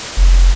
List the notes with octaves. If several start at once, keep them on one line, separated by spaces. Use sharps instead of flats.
F1